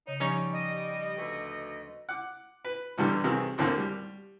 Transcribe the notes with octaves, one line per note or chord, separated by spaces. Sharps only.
C#3 D#4 C#5
F3 G3 C#4 D#4 C#5
D#5
D2 B2 A3
F#5 D6
B4
E2 G2 D3 G3 D4
C2 C3 D#3 E3 G#4
G#1 D#2 A2 D3 A#3 C4
G3